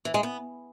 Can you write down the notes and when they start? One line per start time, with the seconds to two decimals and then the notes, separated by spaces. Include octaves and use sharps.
0.05 E3
0.14 G#3
0.23 B3